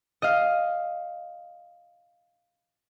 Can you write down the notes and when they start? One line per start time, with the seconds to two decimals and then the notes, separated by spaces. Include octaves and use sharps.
0.22 D#5 F5